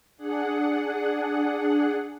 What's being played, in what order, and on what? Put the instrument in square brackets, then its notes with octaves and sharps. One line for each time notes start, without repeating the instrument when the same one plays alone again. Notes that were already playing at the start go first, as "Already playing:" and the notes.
[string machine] D4 G#4 F#5